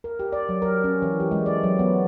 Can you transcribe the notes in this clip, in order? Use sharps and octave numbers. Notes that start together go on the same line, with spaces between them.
A#4
G4
D5
F#3
A#4
C#4
E3
G4
G#3
D5
F#3
B3